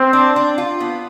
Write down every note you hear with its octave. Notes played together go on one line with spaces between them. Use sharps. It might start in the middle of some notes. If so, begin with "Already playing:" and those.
Already playing: C4
D4
D4
F4
B3